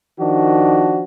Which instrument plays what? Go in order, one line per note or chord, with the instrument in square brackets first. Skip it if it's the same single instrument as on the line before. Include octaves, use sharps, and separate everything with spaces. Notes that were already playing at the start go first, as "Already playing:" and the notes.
[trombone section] D#3 F3 D4 F#4